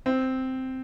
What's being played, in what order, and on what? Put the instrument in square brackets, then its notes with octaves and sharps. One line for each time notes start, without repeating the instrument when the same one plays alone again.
[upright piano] C4